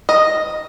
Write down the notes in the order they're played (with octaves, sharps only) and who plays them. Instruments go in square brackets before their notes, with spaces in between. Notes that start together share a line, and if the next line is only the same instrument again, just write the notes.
[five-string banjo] D#5